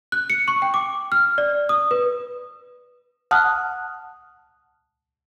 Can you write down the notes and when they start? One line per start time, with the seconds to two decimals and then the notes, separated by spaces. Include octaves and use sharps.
0.12 F#6
0.30 C#7
0.48 C#6
0.62 G5
0.74 D6
1.12 F6
1.38 D5
1.69 D#6
1.91 B4
3.31 F#5 A5 D#6 F6 F#6